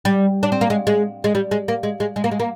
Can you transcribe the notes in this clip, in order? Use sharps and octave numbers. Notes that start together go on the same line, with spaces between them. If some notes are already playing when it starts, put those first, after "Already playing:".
G3
D4
C4
A#3
G#3
G#3
G#3
G3
G#3
A#3
G#3
G#3
G#3
A#3
G#3
A#3